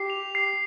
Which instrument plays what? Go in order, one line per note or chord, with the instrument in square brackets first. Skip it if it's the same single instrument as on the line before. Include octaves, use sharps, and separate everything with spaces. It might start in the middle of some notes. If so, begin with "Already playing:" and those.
Already playing: [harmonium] G4 [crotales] C7
[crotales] F7
C7